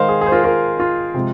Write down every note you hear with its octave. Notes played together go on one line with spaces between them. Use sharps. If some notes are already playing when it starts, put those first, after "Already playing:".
Already playing: D#3 G#3 A#4 C5 D#5 F5
G#4
G#4 C5
F4 A#4
F4 A#4
F4
C3 F3 G#3